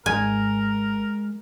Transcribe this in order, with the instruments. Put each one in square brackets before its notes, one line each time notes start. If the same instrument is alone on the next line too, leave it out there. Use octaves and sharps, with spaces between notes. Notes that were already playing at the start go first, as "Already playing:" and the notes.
[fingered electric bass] G#1 G#2 [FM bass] G#3 [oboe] A#4 [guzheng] G#5